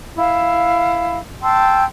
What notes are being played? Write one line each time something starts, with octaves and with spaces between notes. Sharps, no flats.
E4 F5
G5 A5 C6 E6